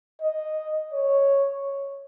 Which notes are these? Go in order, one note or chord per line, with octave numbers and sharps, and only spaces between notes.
D#5
C#5